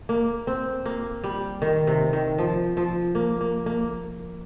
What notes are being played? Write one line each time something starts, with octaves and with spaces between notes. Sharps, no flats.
A#3
C4
A#3
G3
D#3
C3
D#3
F3
F3
A#3
A#3
A#3